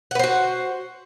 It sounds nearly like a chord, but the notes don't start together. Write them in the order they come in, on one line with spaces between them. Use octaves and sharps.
F#5 B4 C5 F#4